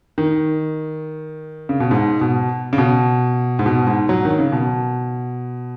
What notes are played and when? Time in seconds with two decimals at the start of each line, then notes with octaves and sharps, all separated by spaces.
0.18 D#3
1.69 C#3
1.80 B2
1.91 G#2
2.21 B2
2.73 C#3
2.78 B2
3.59 G#2
3.66 B2
3.87 G#2
4.09 F#3
4.25 D#3
4.39 C#3
4.52 B2